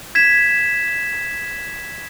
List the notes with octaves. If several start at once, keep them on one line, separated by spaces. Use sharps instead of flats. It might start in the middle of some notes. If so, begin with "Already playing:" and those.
G#6 B6 E7